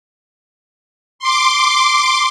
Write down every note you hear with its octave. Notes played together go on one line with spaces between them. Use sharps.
C6 D6